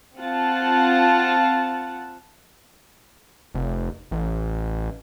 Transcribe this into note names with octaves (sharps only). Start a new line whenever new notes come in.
C4 F4 F#5 A5
F1
A1